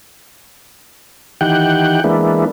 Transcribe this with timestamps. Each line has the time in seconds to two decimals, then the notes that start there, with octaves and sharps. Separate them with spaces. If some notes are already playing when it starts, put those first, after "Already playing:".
1.41 D#3 E3 G4 F#5 G5
2.04 E3 G#3 A#3 B3 D4 E4